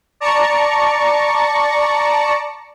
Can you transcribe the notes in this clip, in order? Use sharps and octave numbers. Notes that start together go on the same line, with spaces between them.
D5 A5 A#5 C#6 C#7